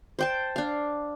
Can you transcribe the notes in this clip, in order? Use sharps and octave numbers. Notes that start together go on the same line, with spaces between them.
C5 G5 A5
D4 F5